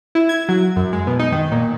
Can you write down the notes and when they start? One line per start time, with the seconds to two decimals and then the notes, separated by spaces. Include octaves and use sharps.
0.15 E4
0.29 G#6
0.49 F#3
0.76 F#2
0.93 G#3
1.07 B2
1.19 D#4
1.32 D#3
1.51 A#2